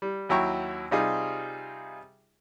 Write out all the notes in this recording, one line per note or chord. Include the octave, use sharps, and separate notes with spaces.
G3
D#2 F#3 E4 G5 A#5 C#6
C3 G3 D#4 F4 G#4